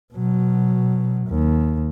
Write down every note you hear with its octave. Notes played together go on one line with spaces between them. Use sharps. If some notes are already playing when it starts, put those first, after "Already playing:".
B2 F#3
D#2